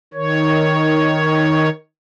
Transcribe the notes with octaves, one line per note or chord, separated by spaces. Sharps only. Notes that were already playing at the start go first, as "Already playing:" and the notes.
D#3 C#5